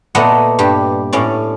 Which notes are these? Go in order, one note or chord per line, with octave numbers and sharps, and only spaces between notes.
A#2 A3 B3 D#5 F#5
G2 G4
A2 C#4 D5